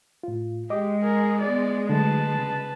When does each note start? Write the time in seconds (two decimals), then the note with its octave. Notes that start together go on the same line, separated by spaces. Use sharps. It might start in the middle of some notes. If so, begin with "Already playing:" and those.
0.23 A2 F4
0.70 G#3 G4 D#5 D6
1.02 G#4 A#4
1.40 B3 D5
1.89 D3 F#3 A3 B4 A5
2.39 C#3